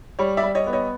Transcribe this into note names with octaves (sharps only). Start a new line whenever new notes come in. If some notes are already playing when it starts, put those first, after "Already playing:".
G3 C#5
D5 E5
G3
C#5 D#5
B3
C#5 D#5